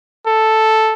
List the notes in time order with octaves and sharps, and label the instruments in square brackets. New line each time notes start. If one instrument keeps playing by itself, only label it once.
[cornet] A4